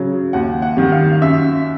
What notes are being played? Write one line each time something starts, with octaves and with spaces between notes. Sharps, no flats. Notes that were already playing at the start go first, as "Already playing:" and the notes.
Already playing: C#3 F#3
D#2 F#5
F#5
D#3 G3
F5
F#2 E5